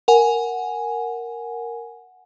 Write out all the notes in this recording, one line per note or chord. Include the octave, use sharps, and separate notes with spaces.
A#4 F#5 G#5